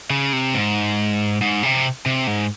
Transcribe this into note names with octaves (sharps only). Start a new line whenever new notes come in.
C#3
C3
G#2
G#2
C3
C3
G#2